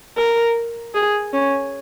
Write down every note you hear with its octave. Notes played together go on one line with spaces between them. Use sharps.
A#4
G#4
C#4